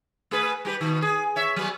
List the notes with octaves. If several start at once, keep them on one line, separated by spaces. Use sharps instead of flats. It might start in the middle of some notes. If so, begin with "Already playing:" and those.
A3 G#4 B4
G3 G4 B4
B2 D#3
G#4
C#5 E5
F#3 B3